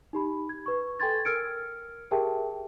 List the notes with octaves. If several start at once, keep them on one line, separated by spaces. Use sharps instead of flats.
D#4 G4 B5
G#6
B4 C#6
A4 G5 G#5 C6 G#6 A6
A#4 E6 F6 G#6 C#7 D7
G4 G#4 A#4 E5 G5 A5